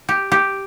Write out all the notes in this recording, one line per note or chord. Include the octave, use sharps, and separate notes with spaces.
G4
G4